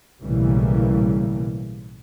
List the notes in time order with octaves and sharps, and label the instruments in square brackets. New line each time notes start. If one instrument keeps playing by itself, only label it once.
[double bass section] B1 A2 C#3 E3 G3 A#3